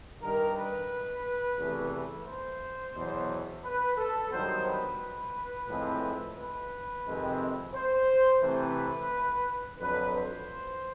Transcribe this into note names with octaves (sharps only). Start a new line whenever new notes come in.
G2 D#3 G3 A#4
B4
E2 C3 E3 A3
C5
E2 B2 F#3 B3
B4
A4
G2 D#3 F#3 B3 C5
B4
A2 F3 G#3 C4
B4
F2 C3 D#3 G#3 C4
C5
C3 E3 A3 C4 B4
F2 D3 F#3 B4
C5